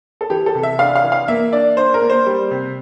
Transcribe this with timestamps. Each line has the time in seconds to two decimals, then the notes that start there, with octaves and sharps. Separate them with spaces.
0.21 A4
0.30 E3 G4
0.46 A4
0.55 C3
0.63 E5
0.79 D4 F5
0.95 F5
1.03 E3
1.12 F5
1.28 A#3 E5
1.53 D4 D5
1.77 D4 C5
1.94 A#4
2.01 A#3
2.10 C5
2.26 G3
2.51 C3